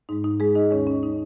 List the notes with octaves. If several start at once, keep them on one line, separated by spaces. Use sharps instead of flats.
G#2 G#3 D#4
D#4
G#3 G#4
D#4 D#5
D#2 D#3 G#3 C#4 C#5
C#4
D#4